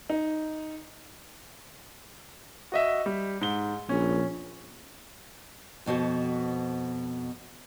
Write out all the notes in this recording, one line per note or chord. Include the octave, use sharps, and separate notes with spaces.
D#4
F#4 D#5 E5
G3
G#2 G7
A#1 C#4
F2 B2 F#4 C5